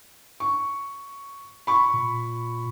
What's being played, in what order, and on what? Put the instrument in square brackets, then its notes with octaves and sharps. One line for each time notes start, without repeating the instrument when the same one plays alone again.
[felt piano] C#6
B5 C#6
[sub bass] A#2